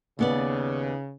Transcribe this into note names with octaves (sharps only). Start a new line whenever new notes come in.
D#2 C#3 B3 D5